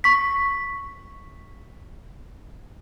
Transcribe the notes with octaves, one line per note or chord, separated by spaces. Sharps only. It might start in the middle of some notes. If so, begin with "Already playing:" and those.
C#6 B6